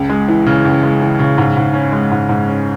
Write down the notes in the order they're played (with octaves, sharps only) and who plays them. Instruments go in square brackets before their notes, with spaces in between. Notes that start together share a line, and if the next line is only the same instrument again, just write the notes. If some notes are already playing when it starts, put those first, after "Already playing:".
Already playing: [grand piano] C#2
G#3
E3
C#3
C#2
G#3
E3
C#3
G#2
G#2
C#4
G#3
G#2
G#2
C#4